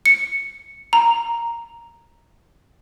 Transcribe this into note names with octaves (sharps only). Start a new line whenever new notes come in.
C#7
A#5